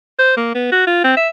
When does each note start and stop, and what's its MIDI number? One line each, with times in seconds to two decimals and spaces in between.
0.19 0.34 72
0.37 0.51 58
0.55 0.68 59
0.72 0.83 66
0.87 1.04 65
1.04 1.13 60
1.17 1.29 76